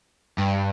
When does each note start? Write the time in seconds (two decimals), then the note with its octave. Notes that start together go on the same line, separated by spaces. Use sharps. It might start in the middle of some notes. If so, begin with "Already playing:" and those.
0.38 G2